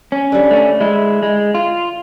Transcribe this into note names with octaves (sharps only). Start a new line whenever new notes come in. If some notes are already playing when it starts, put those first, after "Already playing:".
C#4
D3 G3
A3 C#4
G#3 E4
G#3
F4